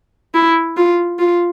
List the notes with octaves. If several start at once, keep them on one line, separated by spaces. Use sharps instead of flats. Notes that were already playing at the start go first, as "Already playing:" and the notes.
E4
F4
F4